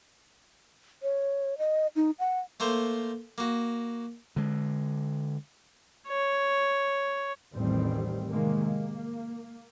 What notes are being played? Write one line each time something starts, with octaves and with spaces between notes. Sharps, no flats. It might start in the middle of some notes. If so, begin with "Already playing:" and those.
C#5
D#5
D#4
F#5
A3 A#3 A#4 C5
A#3 F#4
D3 G#3
C#5
A1 E2 D#3 G3 C4
C3 D#3 G#3 A#3
A#3